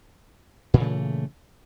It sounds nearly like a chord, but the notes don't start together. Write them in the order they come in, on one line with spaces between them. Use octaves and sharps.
A#2 E3 C#3 A3